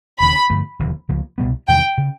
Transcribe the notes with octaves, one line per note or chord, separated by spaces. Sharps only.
E1 D#2 C#3 B5
G2 D3 F3 A3
E1 D#2 D3 F3
C#2 C#3 F3 A#3
C2 B2 G3 B3
E2 C3 D#3 G3 G5
C#3